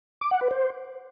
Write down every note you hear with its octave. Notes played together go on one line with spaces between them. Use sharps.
D6
F#5
B4
C5